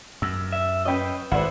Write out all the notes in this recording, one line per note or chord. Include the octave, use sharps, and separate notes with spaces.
F#2 E6
E5
C#4 B4 D#5 G5 G6
G#1 E4 B4 C5 D5 F#5